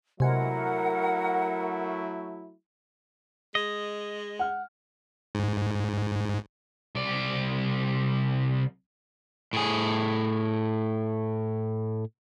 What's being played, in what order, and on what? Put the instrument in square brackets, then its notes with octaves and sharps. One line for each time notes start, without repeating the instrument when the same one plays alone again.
[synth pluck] C3 G#3 [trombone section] F#3 A3 E4 [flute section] A#4 F#5
[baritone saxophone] G#3 [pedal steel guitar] D#5
[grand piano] F#5 F6
[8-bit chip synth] G#2
[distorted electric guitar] C2 D5
[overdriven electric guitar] A2 G#4